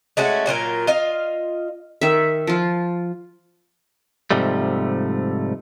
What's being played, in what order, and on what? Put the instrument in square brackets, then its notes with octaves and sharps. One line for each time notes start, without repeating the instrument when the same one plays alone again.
[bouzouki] G#3 A3 C#4 F#4
A#2 F#3 F4 A#4
F4 D#5 F5
[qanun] D#3 E5
F3 F4
[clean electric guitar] G#2 C3 F3 G3 A3